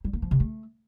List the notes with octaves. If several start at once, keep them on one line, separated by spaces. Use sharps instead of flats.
G3
A#3
F3
C3
A3